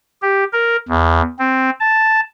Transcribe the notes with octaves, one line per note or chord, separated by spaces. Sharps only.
G4
A#4
E2
C4
A5